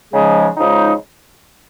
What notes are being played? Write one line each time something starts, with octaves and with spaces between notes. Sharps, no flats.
C#3 F3 G#3 D#4 G#4
C#3 F3 G#3 D#4